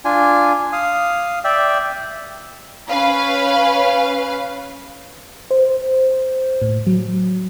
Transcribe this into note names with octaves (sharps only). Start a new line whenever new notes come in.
D4 F4 G#5
F5 D#6
D5 E5 G5 E6
C#4 B4 F5
C5
A2
F#3